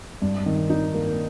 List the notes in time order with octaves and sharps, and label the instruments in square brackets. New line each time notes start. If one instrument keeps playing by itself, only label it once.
[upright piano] G2
D#3
D#4
A#3